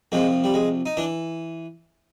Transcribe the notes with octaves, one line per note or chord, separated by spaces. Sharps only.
C2 C3 F3 G#3
G3
G#3
D#4
E3 D4